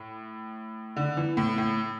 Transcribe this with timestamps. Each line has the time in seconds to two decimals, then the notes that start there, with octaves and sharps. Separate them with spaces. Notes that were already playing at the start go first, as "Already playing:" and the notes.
Already playing: A2
0.96 D3
1.17 E3
1.37 A2
1.58 A2